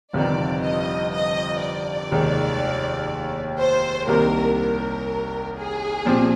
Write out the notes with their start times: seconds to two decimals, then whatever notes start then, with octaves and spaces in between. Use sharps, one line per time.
0.13 G1 F2 C3 D#3 G3 D5
0.62 D#5
1.13 D#5
1.61 D5
2.11 F1 D#2 D#3 G#3
3.59 C5
4.08 C2 C3 D#3 G3 A#3 A#4
4.57 A#4
5.56 G#4
6.05 A#2 F3 C4 G4